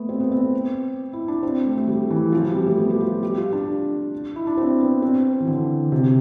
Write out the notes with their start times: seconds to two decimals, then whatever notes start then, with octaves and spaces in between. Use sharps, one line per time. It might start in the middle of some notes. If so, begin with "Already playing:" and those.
Already playing: A3 B3
0.09 C4
0.20 B3
0.32 C4
1.13 E4
1.28 D4
1.43 C4
1.66 A3
1.77 A3
1.88 G3
2.10 E3
2.32 F3
2.44 G3
2.55 G3
2.66 A3
2.78 B3
2.90 G4
3.00 F4
3.23 G4
3.37 F4
3.53 D4
4.36 E4
4.47 D4
4.58 C4
4.80 B3
5.02 C4
5.40 E3
5.47 D3
5.92 C3